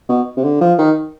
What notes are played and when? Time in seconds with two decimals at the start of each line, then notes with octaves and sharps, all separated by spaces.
0.09 B2
0.37 C3
0.44 D3
0.61 F3
0.78 D#3